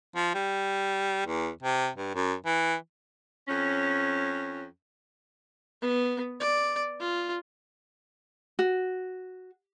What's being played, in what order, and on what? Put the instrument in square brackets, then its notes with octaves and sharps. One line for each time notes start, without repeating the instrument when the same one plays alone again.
[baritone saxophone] F3
G3
E2
C3
G2
F#2
E3
[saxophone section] F2 C#4
[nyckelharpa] B3
D5
F4
[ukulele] F#4